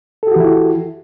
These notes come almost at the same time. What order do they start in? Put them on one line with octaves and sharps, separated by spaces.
A4 G4 F#4 E3 E4